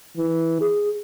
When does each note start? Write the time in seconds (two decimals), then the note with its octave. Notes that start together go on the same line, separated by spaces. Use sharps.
0.17 E3
0.61 G#4